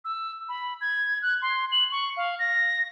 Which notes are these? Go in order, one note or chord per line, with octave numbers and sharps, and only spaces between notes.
E6
B5
G#6
F#6
C6
F#7
C#6
F5
A#6